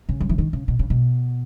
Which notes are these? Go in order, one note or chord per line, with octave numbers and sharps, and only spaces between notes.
C#3
G3
E3
D#3
C#3
B2
C#3
B2